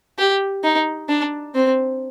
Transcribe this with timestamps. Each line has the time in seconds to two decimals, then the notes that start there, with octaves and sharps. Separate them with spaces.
0.18 G4
0.64 D#4
1.09 D4
1.55 C4